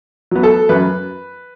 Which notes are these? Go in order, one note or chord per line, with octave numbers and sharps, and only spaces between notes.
F#3 B3
A4
F#2 B4